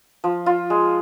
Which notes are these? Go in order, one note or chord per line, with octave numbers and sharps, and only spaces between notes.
F3
F4
G#3